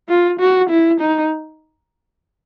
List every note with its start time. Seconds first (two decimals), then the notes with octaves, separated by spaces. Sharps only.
0.09 F4
0.40 F#4
0.70 E4
1.01 D#4